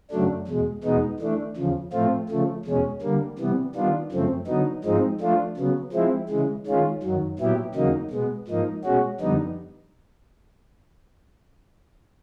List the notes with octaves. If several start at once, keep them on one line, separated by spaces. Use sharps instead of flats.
F#2 C#3 F#3 A3 D4
E2 B2 G#3
E2 B2 G#3 B3 D#4
E3 A3 D4
E2 C#3 F3
A2 F3 A3 C4 F4
C#3 F3 A3
E2 B2 G#3 C#4
D3 G3 A#3
C3 E3 G3 B3
D#3 G3 B3 D4 F4
F#2 C#3 F3 A3 C4
D3 F#3 B3 D#4
G#2 F3 G#3 C4 D#4
F3 A3 D4 F4
C#3 F#3 B3
F3 G#3 C4 E4
C#3 E3 G#3
D#3 G#3 C#4 F4
F#2 D#3 F#3
A#2 F#3 B3 E4 G4
E2 C#3 F#3 A#3 D#4
B2 G#3 B3
G#2 F3 A#3 D#4
B2 G#3 C#4 F#4
F2 D3 G3 B3 D#4